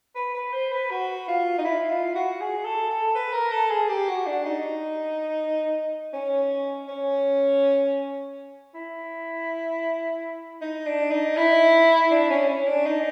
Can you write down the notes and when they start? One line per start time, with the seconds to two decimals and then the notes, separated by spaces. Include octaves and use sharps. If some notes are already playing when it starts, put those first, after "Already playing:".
0.15 B4
0.34 B4
0.52 C5
0.72 B4
0.90 F#4
1.28 F4
1.58 D#4
1.65 E4
1.90 F4
2.15 F#4
2.40 G#4
2.64 A4
2.90 A4
3.15 B4
3.33 A#4
3.51 A4
3.70 G#4
3.89 G4
4.08 F#4
4.26 D4
4.46 D#4
6.13 C#4
6.88 C#4
8.74 E4
10.61 D#4
10.87 D4
11.11 D#4
11.36 E4
12.11 D4
12.30 C#4
12.48 C#4
12.67 D4
12.86 D#4